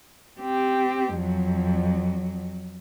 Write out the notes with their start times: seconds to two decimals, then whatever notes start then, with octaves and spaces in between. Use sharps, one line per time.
0.40 C4 G4
1.15 F2 F#3